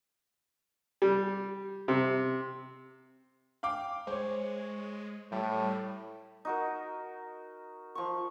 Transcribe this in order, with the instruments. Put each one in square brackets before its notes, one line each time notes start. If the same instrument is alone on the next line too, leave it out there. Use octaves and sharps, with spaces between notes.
[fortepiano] G3
C3
[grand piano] F5 G5 D6
[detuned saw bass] G#3 [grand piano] C5 C#5
[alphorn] A2 [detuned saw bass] G3
[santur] D#4 F#4 A#4
F3 C#6